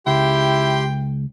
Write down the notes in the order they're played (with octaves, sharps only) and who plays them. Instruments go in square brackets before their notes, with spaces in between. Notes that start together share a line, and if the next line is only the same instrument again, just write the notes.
[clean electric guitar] C#2 [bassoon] E4 [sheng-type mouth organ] G4 C6 [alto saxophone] G5